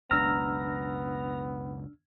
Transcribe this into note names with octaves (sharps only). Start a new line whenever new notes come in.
F#1 C#2 B2 B3 D4 A#5 E6 F6